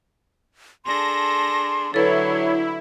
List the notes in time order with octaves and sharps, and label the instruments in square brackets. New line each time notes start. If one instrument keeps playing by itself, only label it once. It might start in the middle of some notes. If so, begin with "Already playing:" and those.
[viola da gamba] D4 G#4 A4 [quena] C6 [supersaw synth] A#6
[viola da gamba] D3 F#3 [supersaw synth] E4 [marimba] A4 B4 [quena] C#5